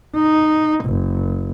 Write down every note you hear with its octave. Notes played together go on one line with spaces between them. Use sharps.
D#4
F#1